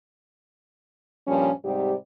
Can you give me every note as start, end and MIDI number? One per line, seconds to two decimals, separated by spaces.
1.27 1.50 43
1.27 1.50 46
1.27 1.50 53
1.27 1.50 55
1.27 1.50 61
1.65 1.93 44
1.65 1.93 48
1.65 1.93 55
1.65 1.93 67